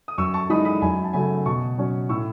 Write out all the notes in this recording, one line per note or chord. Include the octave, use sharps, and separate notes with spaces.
D#6
F#2 C#6 E6
A5 C#6
E3 G#3 D#4 B5 D#6
B5 D#6
F#2 G#5 B5
A5
C#3 F#3 A3 G#5 B5
B2 A5 C#6
F#3 C#4
A2 C#6 E6